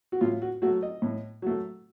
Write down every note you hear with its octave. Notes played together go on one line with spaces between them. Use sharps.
F#4
A2 F4
F#4
F#3 A3 F#4
D#5
A2
F#3 A3